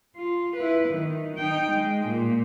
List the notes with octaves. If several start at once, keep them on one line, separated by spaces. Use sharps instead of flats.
F4
E4 B4
D#3
D#4 G5
G#3
A#2